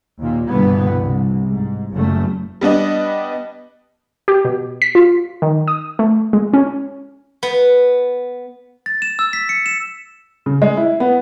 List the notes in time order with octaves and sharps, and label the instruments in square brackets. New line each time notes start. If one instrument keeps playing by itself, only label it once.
[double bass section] D#2 A#2
C2 G2 B2 D3 E3 B3
C2
G#2
F#1 F#2 A#2 A3
[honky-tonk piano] G3 B3 D4 D#5
[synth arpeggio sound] G4
B2
B6
F4
D#3
D#6
A3
G#3
C#4
[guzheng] B3
[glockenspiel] A6
E7
E6
B6
C#7
E7
[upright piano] C#3
G#3
E4
B3